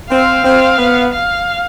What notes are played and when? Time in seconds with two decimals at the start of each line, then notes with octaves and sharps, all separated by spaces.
0.10 C4 F5
0.44 C4
0.78 B3
1.12 F5